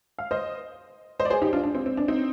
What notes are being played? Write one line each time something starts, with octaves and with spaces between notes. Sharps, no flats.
F5
C5 D#5
C5 D#5
D5
G#4 C5
D#4 G4
D4 F4
D4
C4
C4
D4
C4 D#4